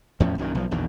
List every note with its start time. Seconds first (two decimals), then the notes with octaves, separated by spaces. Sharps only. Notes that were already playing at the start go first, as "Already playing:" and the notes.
0.20 E2 A2 F3 C#4
0.38 A#1 F#2 A#2 D#3
0.55 B1 F3
0.71 A#1 E2 B2 D#3